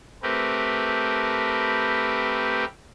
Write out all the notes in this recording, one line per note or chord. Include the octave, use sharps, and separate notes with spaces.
A3 C4 G4 A#4 B4